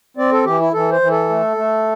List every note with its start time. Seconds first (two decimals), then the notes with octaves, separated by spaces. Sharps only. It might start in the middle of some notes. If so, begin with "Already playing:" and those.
0.17 C4 D5
0.32 A4
0.45 E3 G4
0.60 E4
0.73 E3 A4
0.92 C5
1.01 E3
1.11 A4
1.29 A3
1.57 A3